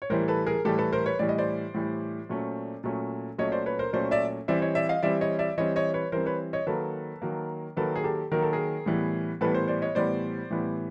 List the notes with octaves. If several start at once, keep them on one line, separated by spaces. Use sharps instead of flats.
C#5
A2 E3 G3 A#4 C5
A4 B4
G#4 A#4
A2 E3 G3 G4 A4
A4 B4
A#4 C5
B4 C#5
A2 E3 G3 D5
D#5
C5 D5
A2 E3 G3
A#2 F#3 A3 C#4
A#2 F#3 A3 C#4
A#2 F#3 A3 C#4 C#5 D#5
C5 D5
B4 C#5
A#4 C5
A#2 F#3 A3 C#4 C5 D5
D5 E5
E3 G3 C4 D5 E5
C#5 D#5
D5 E5
D#5 F5
E3 G3 C4 D5 E5
C#5 D#5
D5 E5
E3 G3 C4 C#5 D#5
C#5 D#5
B4 C#5
E3 G3 C4 A#4 C5
B4 C#5
C#5 D#5
D#3 F#3 A#3 A4 B4
D#3 F#3 A#3
D#3 F#3 A#3 A4 B4
G#4
G4 A4
D#3 F#3 A#3 A#4
A4
G#4 A#4
A2 E3 G3 B3
A2 E3 G3 B3 A4 B4
A#4 C5
C5 D5
C#5 D#5
A2 E3 G3 B3 C5 D5
A2 E3 G3 B3